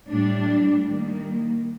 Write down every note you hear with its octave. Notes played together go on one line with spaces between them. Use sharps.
A2 G3 D4
D#3 G3 A#3